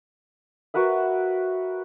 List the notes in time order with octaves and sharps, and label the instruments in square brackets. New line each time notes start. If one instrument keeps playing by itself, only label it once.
[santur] F#4 A#4 B4 E5